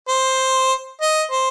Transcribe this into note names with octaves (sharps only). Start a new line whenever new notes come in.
C5
D#5
C5